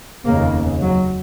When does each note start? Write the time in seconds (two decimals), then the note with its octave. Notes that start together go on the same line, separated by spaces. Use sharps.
0.25 F1 D#2 C#3 A#3
0.81 F#3